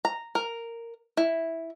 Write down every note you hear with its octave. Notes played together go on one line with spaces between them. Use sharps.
A#5
A#4
E4